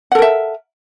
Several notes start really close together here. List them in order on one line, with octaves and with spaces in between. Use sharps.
F#5 A4 A#4 E5